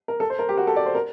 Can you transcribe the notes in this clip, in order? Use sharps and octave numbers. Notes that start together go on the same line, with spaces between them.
A#4
A4
C5
A#4
G4
F#4
A4
D5
C5
A#4